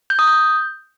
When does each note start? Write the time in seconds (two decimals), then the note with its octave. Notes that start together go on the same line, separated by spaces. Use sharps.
0.10 G6
0.19 D#6
0.27 G6